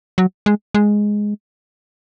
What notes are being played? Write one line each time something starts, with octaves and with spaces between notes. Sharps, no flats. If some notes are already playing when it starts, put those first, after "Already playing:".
F#3
G#3
G#3